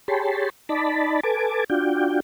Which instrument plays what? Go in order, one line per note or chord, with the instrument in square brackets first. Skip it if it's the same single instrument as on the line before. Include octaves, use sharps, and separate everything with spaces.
[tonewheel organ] G4 G#4 C#5 A5 B5 C6
D#4 D5 A5 B5
A4 B4 G#5 A5 D6
D4 F4 F#4 G5